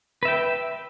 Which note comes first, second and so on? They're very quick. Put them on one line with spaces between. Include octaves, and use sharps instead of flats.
B4 E5 G5